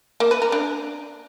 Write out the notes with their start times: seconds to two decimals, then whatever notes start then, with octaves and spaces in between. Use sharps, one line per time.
0.20 A#3
0.31 B4
0.42 A#4
0.52 D4